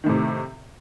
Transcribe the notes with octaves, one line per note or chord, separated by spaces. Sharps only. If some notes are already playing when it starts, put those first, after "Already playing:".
A2 C3 D#3